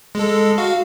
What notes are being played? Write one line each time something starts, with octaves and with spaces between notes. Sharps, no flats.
G#3 A4
F#4 F5